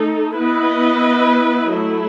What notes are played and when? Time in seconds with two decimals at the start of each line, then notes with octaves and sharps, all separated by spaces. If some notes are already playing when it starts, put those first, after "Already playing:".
Already playing: A3 D#4 A4
0.36 B3 E4 B4 D#5
1.71 F#3 A3 E4